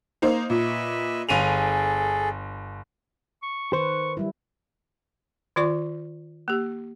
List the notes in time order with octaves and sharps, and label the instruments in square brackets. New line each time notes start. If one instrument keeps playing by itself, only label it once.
[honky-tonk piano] A#3 D#4 C5
[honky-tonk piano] A#2 [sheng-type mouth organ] B4 D#5 E5
[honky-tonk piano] G1 D#7 F7 [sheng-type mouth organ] G#4 A4
[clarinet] C#6
[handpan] D#3 B4 [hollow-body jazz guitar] C5 [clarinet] C#6
[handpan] F#3 G3 E4
[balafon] D#3 F4 D5 C#6
A#3 G4